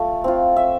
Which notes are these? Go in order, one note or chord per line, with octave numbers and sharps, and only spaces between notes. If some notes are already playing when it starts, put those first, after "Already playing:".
Already playing: A3 F4
C4 F4
E5